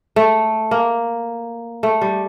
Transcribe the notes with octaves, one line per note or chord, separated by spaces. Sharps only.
A3
A#3
A3
G3